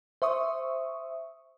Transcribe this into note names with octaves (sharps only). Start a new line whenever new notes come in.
C5 E5 C#6 D#6